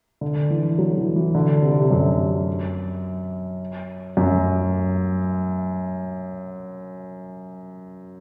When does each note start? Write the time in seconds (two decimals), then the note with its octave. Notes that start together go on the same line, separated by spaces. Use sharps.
0.21 D3
0.50 E3
0.78 F#3
0.98 E3
1.16 E3
1.35 D3
1.62 C3
1.72 D3
1.82 C3
1.91 F#2
4.17 F#2